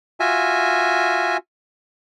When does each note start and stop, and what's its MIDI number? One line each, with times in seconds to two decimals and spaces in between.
0.20 1.37 65
0.20 1.37 66
0.20 1.37 76
0.20 1.37 80